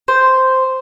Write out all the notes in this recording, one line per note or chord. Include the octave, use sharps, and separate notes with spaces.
C5